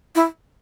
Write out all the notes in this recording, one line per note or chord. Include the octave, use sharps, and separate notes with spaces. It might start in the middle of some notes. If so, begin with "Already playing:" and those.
E4